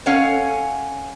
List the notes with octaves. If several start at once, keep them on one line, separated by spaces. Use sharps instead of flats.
C#4 A4 C#5 F5 F#5 G#5